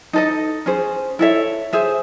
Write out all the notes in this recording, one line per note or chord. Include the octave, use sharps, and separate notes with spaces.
D#4 A4 D#5
C#4 G#4 C5
E4 A4 C#5 E5
G#4 C5 E5